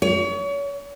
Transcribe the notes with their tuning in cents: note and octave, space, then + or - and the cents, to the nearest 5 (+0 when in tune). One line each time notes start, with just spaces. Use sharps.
C#5 +35